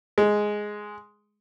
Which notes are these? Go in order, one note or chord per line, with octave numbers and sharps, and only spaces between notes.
G#3